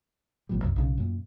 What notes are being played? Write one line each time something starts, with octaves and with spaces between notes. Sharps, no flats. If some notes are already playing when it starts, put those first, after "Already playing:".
A1 B2 F3 G3
C2 F#2
B1 C#3
F#2 A#2